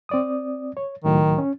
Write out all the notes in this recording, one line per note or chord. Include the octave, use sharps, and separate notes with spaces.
C4 D5 D#6
C#5
C#2 A2 D#3 F#3
C#4